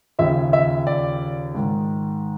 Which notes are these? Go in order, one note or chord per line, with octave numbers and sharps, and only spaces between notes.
D#2 C#3 F3 E5
E5
D5
G#2 D#3